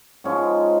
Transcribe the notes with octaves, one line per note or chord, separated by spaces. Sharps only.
G#2 F3 G#3 C#4